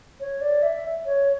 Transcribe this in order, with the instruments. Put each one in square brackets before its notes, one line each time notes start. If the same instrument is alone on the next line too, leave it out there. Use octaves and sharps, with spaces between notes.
[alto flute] C#5
D5
E5
C#5